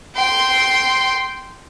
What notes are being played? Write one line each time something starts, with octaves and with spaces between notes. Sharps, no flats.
G5 C6